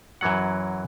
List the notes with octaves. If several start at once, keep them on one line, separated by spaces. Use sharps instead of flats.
F#2 E3 F#3 F#5